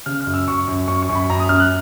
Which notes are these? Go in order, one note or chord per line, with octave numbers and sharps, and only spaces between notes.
C#3 F6
F6
F#2
E6
F#2 C#6
F#2
F#2 C#6
C#6
F#2
B5
F#2 A#5
D#6
F#2 F6
F#6